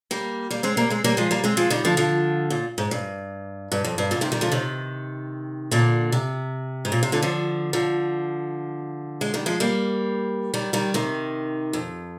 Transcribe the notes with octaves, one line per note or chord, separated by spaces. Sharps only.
G3 A#3
G3 A#3
G#3 C4
G3 A#3
G#3 C4
G3 A#3
F3 G#3
G3 A#3
G#3 C4
F3 G#3
D#3 G3
D3 F3
D3 F3
A#2
G#2
G2
G2
F2
G2
A#2 D3
C3 D#3
D#3 G3
D3 F3
C3 D#3
A#2 D3
C3
G#2
A#2
C3
A#2 D3
D3 F3
D3 F3
G#3
D#3 G3
F3 G#3
G3 A#3
D#3 G3
D#3 G3
C3 D#3
F2